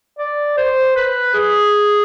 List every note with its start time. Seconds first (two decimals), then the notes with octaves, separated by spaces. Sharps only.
0.19 D5
0.57 C5
0.96 B4
1.34 G#4